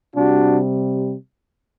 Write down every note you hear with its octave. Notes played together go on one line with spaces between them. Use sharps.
C3 G3 D4 F#4